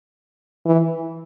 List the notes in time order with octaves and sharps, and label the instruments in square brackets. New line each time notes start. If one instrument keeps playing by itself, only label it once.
[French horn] E3